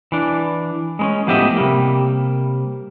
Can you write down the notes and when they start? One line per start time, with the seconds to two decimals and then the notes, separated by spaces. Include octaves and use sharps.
0.12 E3 D4
0.99 G#3 B3 C#4
1.27 A2 F3 B3 G4 D#5 E5
1.57 C3 G3 A#3